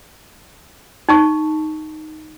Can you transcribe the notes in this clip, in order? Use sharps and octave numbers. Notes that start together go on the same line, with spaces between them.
D#4 A5 C#6